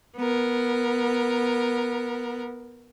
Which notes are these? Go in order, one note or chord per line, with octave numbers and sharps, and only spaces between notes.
B3 A#4